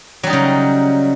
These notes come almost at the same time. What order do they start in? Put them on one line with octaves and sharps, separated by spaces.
F#3 G3 D#4 C#3